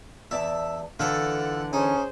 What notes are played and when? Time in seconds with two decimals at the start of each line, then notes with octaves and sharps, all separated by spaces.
0.31 E2 D5 E5 A5
0.99 D3 E3 F4 A4 F#5
1.73 C#4 D#4 G#4 C5